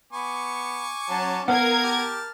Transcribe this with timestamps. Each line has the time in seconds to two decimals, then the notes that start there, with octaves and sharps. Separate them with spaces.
0.13 B3 G#5 C#6 D6
1.09 F#3 C#4 A5
1.48 B3 A#4 F5 G#6
1.83 G4 A5 F6